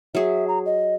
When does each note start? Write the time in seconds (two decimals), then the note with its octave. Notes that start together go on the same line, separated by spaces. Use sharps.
0.15 F#3 G#4 E5
0.48 A#5
0.66 D#5